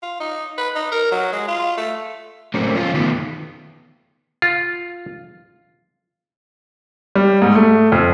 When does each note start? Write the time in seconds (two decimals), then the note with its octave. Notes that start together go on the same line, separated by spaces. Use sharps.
0.03 F4
0.20 D#4
0.58 B4
0.76 D#4
0.92 A#4
1.11 F#3
1.32 G#3
1.48 F4
1.77 A3
2.54 F#3 A3 A#3 C4 C#4
2.75 F3 C#4 F4
2.94 D#3 A3 B3
4.42 F4
7.15 G3
7.42 G#2
7.55 A3
7.92 F2